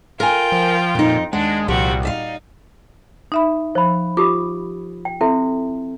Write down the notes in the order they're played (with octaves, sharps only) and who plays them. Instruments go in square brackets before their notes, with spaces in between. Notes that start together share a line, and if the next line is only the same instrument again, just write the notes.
[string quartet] F4 G5 [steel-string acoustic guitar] A#4 G#5
[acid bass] F3
[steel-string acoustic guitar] F2 D#4 [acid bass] A#2
[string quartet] D#2 D4 [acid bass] G#3 [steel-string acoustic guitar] F#5
[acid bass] C2 [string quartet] A#2 G3 F#4 [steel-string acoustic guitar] F3 G4
[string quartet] D#4 [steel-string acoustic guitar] D5 E5 F5
[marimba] D#4 E5 B5
[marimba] F3 [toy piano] C5 B5
[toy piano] F4 G4 D#6 [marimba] D6
[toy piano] G5
[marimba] C4 [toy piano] E4 A4 E5